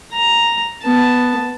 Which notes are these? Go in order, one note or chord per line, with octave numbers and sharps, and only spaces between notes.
A#5
B3 A5